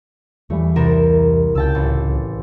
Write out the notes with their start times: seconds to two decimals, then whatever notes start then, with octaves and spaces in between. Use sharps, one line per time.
0.50 E2 E3 G3 A3
0.76 C2 A#4 E7
1.55 C#2 C#3 G5 A5 E6
1.75 A1